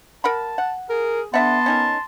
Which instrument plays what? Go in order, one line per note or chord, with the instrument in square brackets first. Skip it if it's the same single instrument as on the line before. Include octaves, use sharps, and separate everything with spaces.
[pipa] A#4 F#5 B5 [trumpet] A5
[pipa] F#5
[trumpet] G#4 [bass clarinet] A#4
[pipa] D3 E5 F#5 [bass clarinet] B3 [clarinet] A5 [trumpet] C6
[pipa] C#4 D#4 A#4